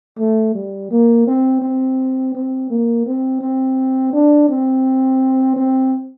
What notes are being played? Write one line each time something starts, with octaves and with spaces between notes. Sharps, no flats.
A3
G3
A#3
C4
C4
C4
A#3
C4
C4
D4
C4
C4